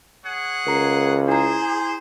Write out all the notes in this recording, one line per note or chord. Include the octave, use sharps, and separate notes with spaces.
G#4 C#5 F#5
C#2 A#4 A#5 C7
E4 G#4 C5 A#5